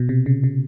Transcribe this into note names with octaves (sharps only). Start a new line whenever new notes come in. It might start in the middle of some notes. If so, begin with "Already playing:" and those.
Already playing: B2
C3
C#3
C#3